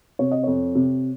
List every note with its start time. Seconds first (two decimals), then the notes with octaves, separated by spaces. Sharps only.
0.19 C3 C#5
0.31 D#5
0.43 F2 C#5
0.75 C3